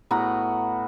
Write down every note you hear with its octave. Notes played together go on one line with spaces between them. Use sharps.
A2 B3 F#4 A#5